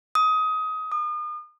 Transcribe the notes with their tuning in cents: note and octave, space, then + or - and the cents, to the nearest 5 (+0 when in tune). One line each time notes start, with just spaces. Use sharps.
D#6 +20
D#6 -40